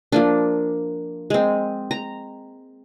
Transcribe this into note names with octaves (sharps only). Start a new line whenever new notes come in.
F3 A#3 D4
G#3 C4
A#5